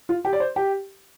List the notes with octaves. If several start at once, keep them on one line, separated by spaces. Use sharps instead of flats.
F4
G4
D5
C5
G4